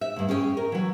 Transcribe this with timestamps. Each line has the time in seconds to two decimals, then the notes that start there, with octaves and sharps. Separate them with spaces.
0.01 E5
0.16 D2 G2
0.29 C#4 G#4 G5
0.57 A#4
0.72 E3 F#3